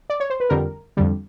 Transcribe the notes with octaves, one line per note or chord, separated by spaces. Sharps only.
D5
C#5
C5
B4
F2 D3 G3 A#4
F2 D3 G3